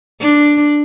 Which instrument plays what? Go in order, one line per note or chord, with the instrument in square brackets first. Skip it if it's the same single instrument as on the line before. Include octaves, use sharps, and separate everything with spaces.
[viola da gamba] D4